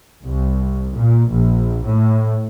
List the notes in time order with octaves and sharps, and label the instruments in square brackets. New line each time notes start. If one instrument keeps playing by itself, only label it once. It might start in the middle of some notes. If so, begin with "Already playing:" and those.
[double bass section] C2
A#2
A#1
A2